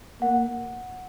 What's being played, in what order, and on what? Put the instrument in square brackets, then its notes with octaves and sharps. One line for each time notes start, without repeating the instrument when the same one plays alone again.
[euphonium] A#3 [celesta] F#5